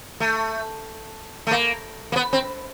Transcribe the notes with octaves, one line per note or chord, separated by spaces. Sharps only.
A3
A3
A#3
A#3
B3
C4